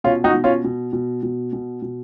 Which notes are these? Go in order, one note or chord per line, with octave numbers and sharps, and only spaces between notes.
B2 C#4 F4
D#4 F#4
B2
C#4 F4
B2
B2
B2
B2
B2